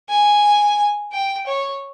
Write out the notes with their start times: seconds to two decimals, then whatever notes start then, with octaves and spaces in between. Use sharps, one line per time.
0.09 G#5
1.12 G5
1.47 C#5